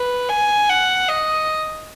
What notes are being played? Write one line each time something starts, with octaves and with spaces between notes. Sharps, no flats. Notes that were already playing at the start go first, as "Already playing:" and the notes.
Already playing: B4
G#5
F#5
D#5